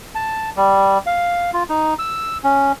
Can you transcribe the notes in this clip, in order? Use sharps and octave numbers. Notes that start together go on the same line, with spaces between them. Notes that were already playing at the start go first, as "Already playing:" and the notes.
A5
G3
F5
F4
D#4
E6
C#4